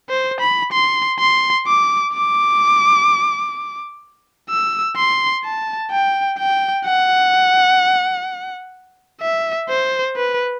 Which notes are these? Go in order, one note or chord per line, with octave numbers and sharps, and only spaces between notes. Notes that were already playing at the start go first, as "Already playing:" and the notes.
C5
B5
C6
C6
D6
D6
E6
C6
A5
G5
G5
F#5
E5
C5
B4